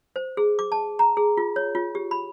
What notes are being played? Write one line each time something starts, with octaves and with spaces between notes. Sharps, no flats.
C5
G#4
D6
A5
A#5
G#4
F4
C#5
F4
G4
B5